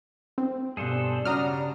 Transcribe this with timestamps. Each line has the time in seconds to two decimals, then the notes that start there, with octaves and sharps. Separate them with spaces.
0.38 C4
0.77 G2 B2 G#4 A4 C5 D5
1.25 C#3 G3 C#4 D4 F#4 A#5 D#6 F6